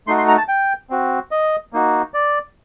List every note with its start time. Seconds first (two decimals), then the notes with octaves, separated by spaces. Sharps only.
0.07 A3 D#4 F#4 C6
0.18 C6
0.28 A#5
0.38 A5
0.48 G5
0.90 C4 F#4
1.31 D#5
1.73 A#3 D#4 F#4
2.14 D5